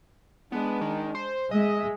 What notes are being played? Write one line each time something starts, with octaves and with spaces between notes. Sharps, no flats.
G#3 B3 D4
D#3
C5
G#3 D#5 E5